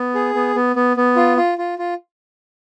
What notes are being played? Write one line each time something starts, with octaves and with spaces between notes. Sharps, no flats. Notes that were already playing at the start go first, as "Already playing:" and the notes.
Already playing: B3
G#4
B3
B3
B3
B3
F4
F4
F4
F4